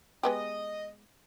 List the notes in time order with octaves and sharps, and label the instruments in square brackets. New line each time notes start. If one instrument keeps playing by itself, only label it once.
[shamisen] G#3 B3 G4 [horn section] D#5